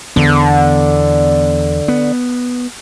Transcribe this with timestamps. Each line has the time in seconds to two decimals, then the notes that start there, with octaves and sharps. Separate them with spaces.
0.16 E2 D3 B3
1.88 B3